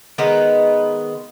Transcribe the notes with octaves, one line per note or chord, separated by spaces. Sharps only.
D#3 G#3 B3 B4